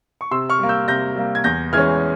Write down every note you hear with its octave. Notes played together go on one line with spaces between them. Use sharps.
C#6
C3 C6 E6
C#6 F6
G3 A#3
E6 G6
C3 G6 A#6
G3 A#3
G#6
E2 G6 A#6
E3 G#3 C#4 F6 G#6